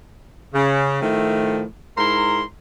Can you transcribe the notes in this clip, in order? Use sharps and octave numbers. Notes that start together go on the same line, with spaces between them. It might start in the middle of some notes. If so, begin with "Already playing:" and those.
C#3
A2 D#3 F3 A3
G#2 E4 A#4 A#5 C6